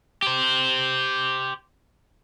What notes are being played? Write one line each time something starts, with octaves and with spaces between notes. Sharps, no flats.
G4 C5